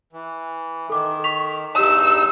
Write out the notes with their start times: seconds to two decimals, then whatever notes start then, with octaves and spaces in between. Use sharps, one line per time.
0.13 E3
0.90 D#3 A4 D6
1.24 C#6 B6 F7
1.75 E2 G2 D#4 G4 E6 E7